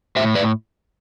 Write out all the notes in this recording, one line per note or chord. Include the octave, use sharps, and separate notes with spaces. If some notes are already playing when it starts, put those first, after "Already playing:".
A2 C5 E5
B4 D5